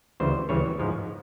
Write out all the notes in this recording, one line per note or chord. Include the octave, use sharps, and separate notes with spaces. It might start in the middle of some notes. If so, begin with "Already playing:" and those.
D2 C#3 E3 G3 C5
D2 C#3 E3 G3 C#5
G#2 F3 G#3